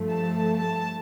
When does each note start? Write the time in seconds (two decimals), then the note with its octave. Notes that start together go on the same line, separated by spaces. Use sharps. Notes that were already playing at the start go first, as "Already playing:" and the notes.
Already playing: G2 F3 A3
0.10 A5
0.56 A5